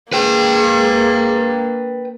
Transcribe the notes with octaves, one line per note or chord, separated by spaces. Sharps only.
A#3 G#4 B4 G5